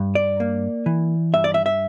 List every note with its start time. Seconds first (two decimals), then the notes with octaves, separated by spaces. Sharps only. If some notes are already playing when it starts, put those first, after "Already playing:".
Already playing: G2
0.15 D5
0.40 A#3
0.86 E3
1.34 G2 E5
1.44 D5
1.54 E5
1.66 E5